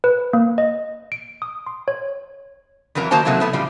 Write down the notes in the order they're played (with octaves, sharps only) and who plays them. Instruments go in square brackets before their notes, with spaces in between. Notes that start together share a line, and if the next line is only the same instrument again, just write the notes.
[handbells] B4
A#3
D#5
D7
D#6
C6
C#5
[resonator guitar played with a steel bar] F2 E3 F#3 A#4 A#5
D#3 A#3 F#4 C5 A5 A#5
C3 F#3 A3 A#3 D#4 E4
A3 B3 E4
A2 C#3 F3 G3